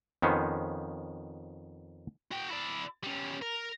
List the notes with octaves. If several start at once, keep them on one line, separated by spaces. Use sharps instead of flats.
F2 D#3 B3 C#4 C5
F#4 G5
E4 D5
G3 C#4
A#4